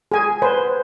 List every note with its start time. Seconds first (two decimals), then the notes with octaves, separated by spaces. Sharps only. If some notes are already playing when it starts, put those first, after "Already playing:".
0.12 G#4 G#5
0.42 B4 C5